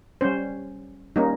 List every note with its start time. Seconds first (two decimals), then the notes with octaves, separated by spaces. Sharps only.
0.21 G3 C#4 C5
1.16 G3 A#3 C#4 D#4